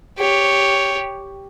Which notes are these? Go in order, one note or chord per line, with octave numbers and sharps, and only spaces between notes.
G4 C#5